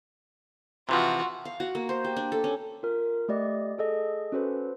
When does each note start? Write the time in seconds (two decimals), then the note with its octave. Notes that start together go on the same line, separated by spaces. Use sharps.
0.89 C3 E3 F3 F4 F#4
1.45 F5
1.60 F#4
1.75 A#3
1.89 C5
2.04 G4
2.16 D4
2.32 A4
2.44 C#4
2.83 F4 A#4
3.29 A3 G4 D5 D#5
3.78 G#4 A4 D#5
4.32 C#4 F#4 A4 B4 C5